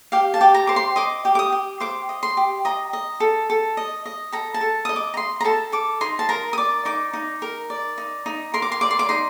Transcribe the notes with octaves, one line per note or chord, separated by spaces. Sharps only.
G4 F5
A5
G4
A#5
C5 D6
C6
D#5 D6
G4
D6
D#6
G4
C5 D6
D#5
C6
G4
D#5 A#5
D#5
A4
A4
D#5
D#5
A4 A#5
A5
A4
D#5 D#6
D6
A#5
D#5 C6
A#5
A4 A5
A4 D6
D#4 C6
A5
A#4 A#5
D#6
D5 D6
D#4 D6
D#4
A#4
D5
D#4
D#4
A#4 C6
D6
C6
D5 D6
C6
D6
D#4 C6